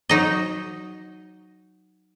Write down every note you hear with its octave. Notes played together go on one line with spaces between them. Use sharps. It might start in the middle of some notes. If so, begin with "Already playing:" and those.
F#3 D#4 D#5